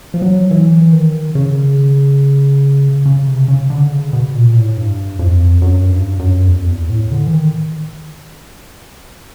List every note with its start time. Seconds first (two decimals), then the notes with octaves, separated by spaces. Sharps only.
0.14 F3
0.22 F#3
0.51 E3
0.92 D#3
1.35 C#3
3.06 C#3
3.27 C3
3.48 C#3
3.70 D3
3.92 C#3
4.13 B2
4.35 A#2
4.56 A2
4.77 G2
5.19 F2
5.62 F#2
5.90 G2
6.19 F#2
6.48 E2
6.63 F2
6.69 E2
6.90 A2
7.12 D3
7.27 E3
7.33 D#3